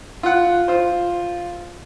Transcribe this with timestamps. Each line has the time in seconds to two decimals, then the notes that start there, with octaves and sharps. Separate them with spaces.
0.23 F4 F#5
0.68 F4 C5